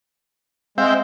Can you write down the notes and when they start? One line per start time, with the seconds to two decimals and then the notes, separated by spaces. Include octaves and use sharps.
0.78 G#3 C4 E5 F5 G5